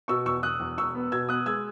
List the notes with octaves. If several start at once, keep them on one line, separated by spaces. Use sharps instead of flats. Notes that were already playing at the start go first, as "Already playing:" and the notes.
B2 C#6 E6
E2 C#6 E6
E1 D#6 F#6
E2
E1 C#6 E6
B3
B2 E6 G#6
B3 D#6 F#6
G#3 E6 G#6